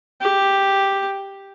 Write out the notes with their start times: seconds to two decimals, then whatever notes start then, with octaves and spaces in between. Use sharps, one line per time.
0.21 G4